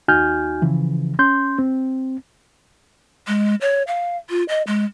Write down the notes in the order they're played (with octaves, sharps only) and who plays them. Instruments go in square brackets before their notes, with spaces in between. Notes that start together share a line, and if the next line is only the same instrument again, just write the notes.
[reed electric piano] D#2 D#4 F#4 G#5 F6 G6
C#3 E3 F3
C#4 C6 G6
C4
[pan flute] G#3
C#5
F5
F4
D#5
G#3